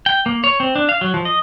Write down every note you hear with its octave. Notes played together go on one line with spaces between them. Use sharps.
G5
A#3
C#5
C4
D4
F5
F#3
F3
D#5